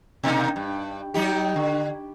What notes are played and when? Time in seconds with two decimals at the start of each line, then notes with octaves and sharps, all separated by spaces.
0.23 B2 A#3 D#4
0.56 G2
1.14 F#3 D#4 G4
1.56 D3